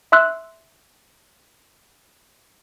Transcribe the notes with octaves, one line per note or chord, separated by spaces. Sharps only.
E5 C6 E6 F#6